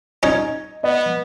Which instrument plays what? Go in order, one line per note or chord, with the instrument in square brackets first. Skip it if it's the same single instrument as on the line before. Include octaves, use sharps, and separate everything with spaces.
[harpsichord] C#4 D#4 [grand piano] D#5 G#6
[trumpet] B3 [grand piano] D#5